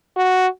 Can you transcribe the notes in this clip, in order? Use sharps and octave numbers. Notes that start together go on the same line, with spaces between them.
F#4